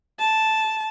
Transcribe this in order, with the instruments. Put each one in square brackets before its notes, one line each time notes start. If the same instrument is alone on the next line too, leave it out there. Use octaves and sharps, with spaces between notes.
[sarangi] A5